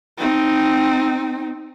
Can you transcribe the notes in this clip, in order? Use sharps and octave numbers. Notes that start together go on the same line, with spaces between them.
C4 D#4